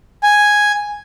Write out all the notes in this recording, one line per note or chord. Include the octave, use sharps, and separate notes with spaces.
G#5